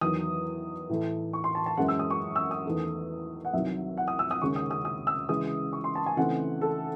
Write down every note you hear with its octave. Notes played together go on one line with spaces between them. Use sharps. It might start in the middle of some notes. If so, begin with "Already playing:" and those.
E2 D#3 F#3 D#6
A2 E3 A3
C#6
C6
A5
A5
F#2 E3 G#3 C#4 E4 F#5
E6
D#6
C#6
E6
D#6
E2 D#3 A3
F#5
C2 C3 D#3 F#3 E5
F#5
D#6
E6
D#6
D#2 C#3 G#3 C#4 C#6
D#6
D#6
D#6
E6
C#3 E3 G#3 D#6
C#6
C6
A5
G#5
C#3 E3 A3 C4 D#4 F#5
A4